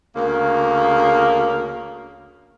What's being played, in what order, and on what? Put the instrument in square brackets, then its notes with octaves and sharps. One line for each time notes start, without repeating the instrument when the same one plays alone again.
[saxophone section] D2 C#3 A#3